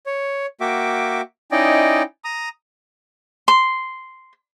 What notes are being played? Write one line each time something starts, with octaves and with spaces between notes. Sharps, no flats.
C#5
A#3 F#4 E5 G5 D6
C#4 D#4 E4 D5 D#5 G5
A#5 D#6
C6